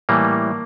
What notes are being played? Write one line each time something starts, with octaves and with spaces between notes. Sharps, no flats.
A2 E3 G3 A#3